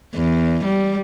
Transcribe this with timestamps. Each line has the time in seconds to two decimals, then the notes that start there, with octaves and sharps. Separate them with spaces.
0.16 E2
0.65 G3